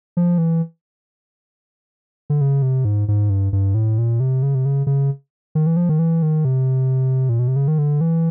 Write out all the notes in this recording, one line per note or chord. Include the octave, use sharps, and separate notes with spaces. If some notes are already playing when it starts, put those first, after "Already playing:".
F3
E3
D3
C#3
C3
G#2
G#2
G2
G2
A2
A#2
C3
C#3
C3
C#3
C#3
D#3
E3
F3
D#3
E3
D#3
C3
A#2
B2
C3
C#3
D#3
D3
E3